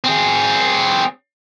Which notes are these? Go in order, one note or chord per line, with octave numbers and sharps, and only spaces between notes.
C4 G#4